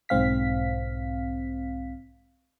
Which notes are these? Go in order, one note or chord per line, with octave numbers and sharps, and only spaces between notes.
B1 G#2 C4 F5 B6